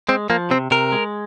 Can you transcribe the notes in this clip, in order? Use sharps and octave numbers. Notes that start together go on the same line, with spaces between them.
G#3 C4
F3 A#3
C3 C4
C3 A#4
G#3